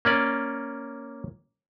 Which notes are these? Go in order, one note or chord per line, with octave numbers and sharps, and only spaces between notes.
A#3 C#4 D5